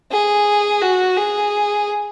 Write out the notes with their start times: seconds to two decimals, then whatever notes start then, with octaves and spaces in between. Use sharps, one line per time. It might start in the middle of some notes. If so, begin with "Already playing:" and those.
0.12 G#4
0.82 F#4
1.17 G#4